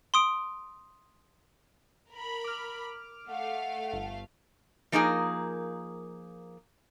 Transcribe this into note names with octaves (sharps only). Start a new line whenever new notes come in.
C6 D#6 D7
A#4 B5
D6 F6
A3 F5 F#5
G1
F3 A#3 D#4 G#4 A#4